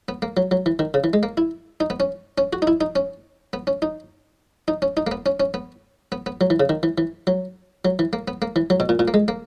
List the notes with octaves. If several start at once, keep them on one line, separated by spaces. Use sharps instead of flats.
B3
A#3
F#3
F#3
E3
D#3
C#3
E3
G#3
A#3
E4
D#4
B3
C#4
C#4
F#4
D#4
E4
D#4
C#4
B3
C#4
D#4
D#4
C#4
D#4
A#3
B3
C#4
C#4
B3
B3
B3
F#3
E3
C#3
D#3
E3
E3
F#3
F#3
E3
A#3
B3
A#3
E3
F#3
B2
A#2
A#2
A#3
G#3
A#3